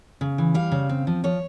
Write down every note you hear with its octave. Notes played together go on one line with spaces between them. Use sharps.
C#3
E3
G3 F5
C#3
C4
F3
F3 C#5